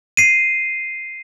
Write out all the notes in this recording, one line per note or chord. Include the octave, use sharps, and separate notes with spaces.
C7 D#7